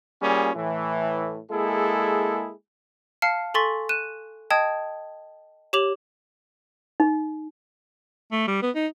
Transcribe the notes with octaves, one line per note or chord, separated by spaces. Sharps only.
G3 A#3 C#4 F4 G#4
A2 E3
G#3 A#3 E4 G#4 A4
F5 A5 F6 C7 C#7
A4 G#5 C6 C#6 A6 B6
F#6 D#7 E7
D#5 G5 A5 D#6 G#6
G4 C#5 D6 F7 F#7
D#4
A3
G3
B3
D#4